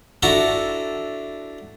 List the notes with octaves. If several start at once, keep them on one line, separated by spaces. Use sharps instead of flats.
D4 E4 F#4 A4 A#5